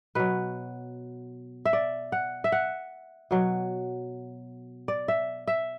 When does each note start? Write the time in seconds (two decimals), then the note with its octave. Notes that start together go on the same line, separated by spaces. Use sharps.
0.15 B2 F#3 B4
1.65 E5
1.73 D5
2.12 F#5
2.44 E5
2.52 F#5
3.31 B2 F#3
4.88 D5
5.08 E5
5.47 E5